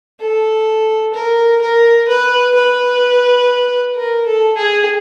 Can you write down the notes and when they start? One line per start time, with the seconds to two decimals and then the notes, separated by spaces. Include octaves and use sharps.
0.20 A4
1.14 A#4
1.62 A#4
2.08 B4
2.54 B4
3.96 A#4
4.26 A4
4.57 G#4